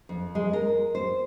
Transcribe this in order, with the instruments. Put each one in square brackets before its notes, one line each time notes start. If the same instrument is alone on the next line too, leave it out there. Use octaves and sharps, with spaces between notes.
[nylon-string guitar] F2
G#3
A#4
C5